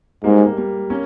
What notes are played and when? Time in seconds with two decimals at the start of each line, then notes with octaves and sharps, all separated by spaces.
0.24 G#2 G3 A#3
0.46 G3 A#3
0.57 G3 A#3
0.90 A#3 C#4